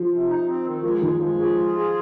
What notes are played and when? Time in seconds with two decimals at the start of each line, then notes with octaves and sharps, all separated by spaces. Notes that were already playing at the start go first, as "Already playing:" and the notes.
Already playing: F3
0.10 C3
0.28 D#4
0.46 C4
0.64 D#3
0.83 F3 G#3
1.02 D#3 G#3
1.20 F3 G#3
1.39 F3 G#4
1.58 F4
1.75 G#4